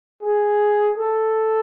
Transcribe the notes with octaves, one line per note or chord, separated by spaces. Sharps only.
G#4
A4